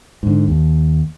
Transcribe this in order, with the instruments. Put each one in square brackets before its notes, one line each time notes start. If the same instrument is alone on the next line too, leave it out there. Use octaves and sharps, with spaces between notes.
[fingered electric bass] G#2 D3
D#2